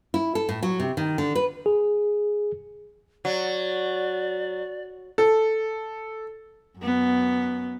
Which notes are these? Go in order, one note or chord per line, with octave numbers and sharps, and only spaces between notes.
E4
A4
A2
F#3
C3
D#3
D3
B4
G#4
F#3 D5
A4
F#2 B3